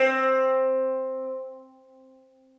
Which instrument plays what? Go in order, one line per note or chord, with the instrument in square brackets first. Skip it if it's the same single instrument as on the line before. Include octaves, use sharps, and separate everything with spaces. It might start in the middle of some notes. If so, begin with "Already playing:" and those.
Already playing: [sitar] C4